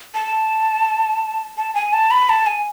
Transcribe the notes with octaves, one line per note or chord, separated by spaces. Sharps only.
A5
A5
G#5
A5
B5
A5
G#5